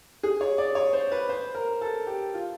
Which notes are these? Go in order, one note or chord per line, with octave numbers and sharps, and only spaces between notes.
G#4
C#5
D5
C#5
C5
B4
C5
A#4
A4
G4
F4